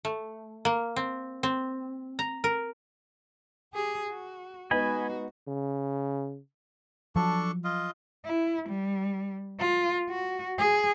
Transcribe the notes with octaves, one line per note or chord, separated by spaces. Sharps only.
A3
A#3
C4
C4
A#5
A#4
G4 G#4
F#4
G#3 B3 D#4 F#4 B4 D#5 G#5 B5
C#3
F3 F#3 D4 A4 C#6
F4 D#5 F5
E4
G3
F4
F#4
G#4